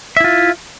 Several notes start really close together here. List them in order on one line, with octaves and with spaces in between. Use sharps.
E5 E4 F4